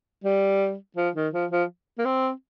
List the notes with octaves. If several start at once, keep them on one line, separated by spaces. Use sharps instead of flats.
G3
F3
D#3
F3
F3
A#3
C4